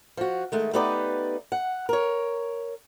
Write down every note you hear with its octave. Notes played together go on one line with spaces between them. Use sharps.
F3 F#4
D#3 G#3 A3
A3 B3 D#4 G4 B4 D5
F#5
A#4 C#5